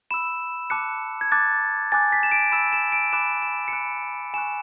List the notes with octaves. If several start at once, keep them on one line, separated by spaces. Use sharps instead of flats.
B5 E6 E7
A5 D6 F#6 C#7
G#6
A5 D6 F#6 A6
G#5 D6 F#6 A6
B6
E7
D7
B5 E6 E7
E7
D7
B5 D6 F#6 E7
E7
C#7
B5 F#6 D7
G#5 C#6 F#6 E7